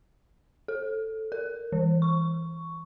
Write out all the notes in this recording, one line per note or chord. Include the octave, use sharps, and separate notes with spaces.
A4
A#4
E3
C#6